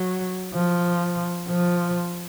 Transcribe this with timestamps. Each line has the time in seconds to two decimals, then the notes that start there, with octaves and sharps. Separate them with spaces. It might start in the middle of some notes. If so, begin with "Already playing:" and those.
Already playing: F#3
0.54 F3
1.49 F3